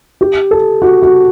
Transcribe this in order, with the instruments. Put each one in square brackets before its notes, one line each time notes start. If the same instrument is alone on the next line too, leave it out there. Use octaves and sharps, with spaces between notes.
[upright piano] G4
A4
F#4
F#4